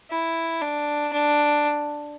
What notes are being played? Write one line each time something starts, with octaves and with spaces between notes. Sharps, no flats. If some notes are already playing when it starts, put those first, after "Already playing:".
E4
D4
D4